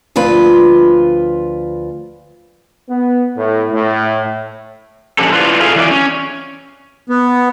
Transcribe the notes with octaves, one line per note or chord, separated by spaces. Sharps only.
D2 F3 F4 B4
B3
A2
A2
A#2 D3 F3 C#4 G4 A4
E4 F4 B4 D5 F5
F4 G#4 A4 E5 F5
E3 F#3 D5
C#4
B3